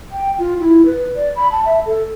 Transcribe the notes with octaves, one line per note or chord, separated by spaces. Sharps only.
G5
F4
E4
B4
D5
B5
A5
E5
A4